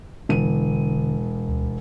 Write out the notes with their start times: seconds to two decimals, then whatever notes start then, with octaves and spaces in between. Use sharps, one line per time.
0.29 E1 D3 D#7
1.48 D2